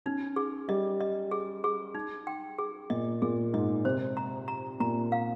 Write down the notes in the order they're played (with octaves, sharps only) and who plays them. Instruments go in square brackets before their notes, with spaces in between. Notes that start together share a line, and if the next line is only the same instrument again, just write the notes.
[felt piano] C#4 [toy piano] D#4
[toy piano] G#4
[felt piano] G3 [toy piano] D#5
[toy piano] D#5
G#4
G#4
D#4
G5
G#4
[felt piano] A#2 [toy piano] D#5
[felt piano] A#2 [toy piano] G#4
[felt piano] G#2 [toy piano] D#5
[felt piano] C3 [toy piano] C5
[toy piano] A#5
A#5
[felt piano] A#2 [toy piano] A#5
[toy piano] F5